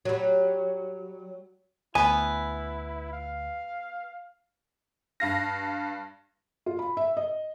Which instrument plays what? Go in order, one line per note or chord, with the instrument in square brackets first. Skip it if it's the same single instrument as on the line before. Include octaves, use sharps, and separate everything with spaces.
[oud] F#3 G3
[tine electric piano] D2 [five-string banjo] B3 B4 [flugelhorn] E4 [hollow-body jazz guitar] G#5
[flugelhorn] F5
[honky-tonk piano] G2 F5 A#6
[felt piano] F4
B5
E5
D#5